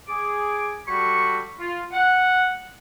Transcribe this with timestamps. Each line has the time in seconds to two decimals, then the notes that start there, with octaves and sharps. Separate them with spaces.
0.08 G#4 D6
0.87 G3 F#4 A4 B5 C#6
1.60 F4
1.92 F#5